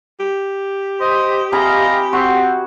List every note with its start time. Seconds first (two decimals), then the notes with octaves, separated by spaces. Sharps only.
0.20 G4
1.01 C5 D#5
1.52 C3 G#4 D#5 F5 A#5 B5
2.13 C4 F#4